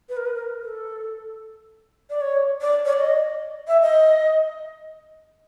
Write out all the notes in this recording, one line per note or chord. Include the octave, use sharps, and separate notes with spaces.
B4
A#4
B4
A#4
A4
D5
C#5
D5
C#5
D5
D#5
E5
D#5